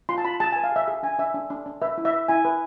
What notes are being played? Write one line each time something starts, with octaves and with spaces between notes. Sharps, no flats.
F4 C6
A5
F4 B5
G#4 A5
B4 G#5
F5
G#4 E5
G#4 E5
D4 G#5
D4 E5
D4
D4
D4
B4 E5
E4
E5
B4
E4 G#5
B4